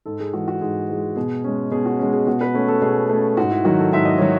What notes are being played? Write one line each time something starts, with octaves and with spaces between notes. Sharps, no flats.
G#2 A4
G#4
E3 G#3 F#4
F#4
G#2 G#4
E3 G#3
B2 G#4
G#3 C#4
B2 G#4
F#4
G#3 C#4
G#4
B2 F#4
B4
A3 C#4
A4
B2 G#4
A3 C#4
G#2 F#4
E4
D#3 F#3 F#4
A4
G#2 E5
D#5
D#3 F#3 C#5